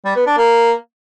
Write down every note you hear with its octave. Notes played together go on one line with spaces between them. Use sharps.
G3
B3
D4
A#3